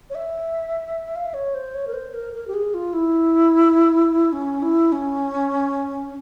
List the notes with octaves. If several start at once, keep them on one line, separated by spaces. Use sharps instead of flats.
C#5
E5
F5
E5
C#5
C5
C#5
A#4
C5
A#4
A#4
G4
G#4
F4
E4
C#4
E4
C#4